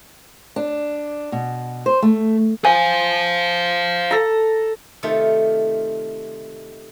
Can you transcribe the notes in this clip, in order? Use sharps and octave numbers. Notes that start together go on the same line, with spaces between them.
D4
B2
C5
A3
C5 F5 G#5
A4 A#5
C3 D#3 A3 F4